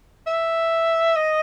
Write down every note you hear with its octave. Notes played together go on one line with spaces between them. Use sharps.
E5
D#5